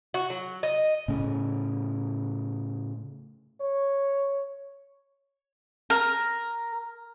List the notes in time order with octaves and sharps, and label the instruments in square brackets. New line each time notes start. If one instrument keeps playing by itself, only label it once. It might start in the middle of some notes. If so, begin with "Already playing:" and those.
[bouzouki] F#4
F#3
D#5
[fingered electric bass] A2 C#3
[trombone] C#5
[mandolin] A#4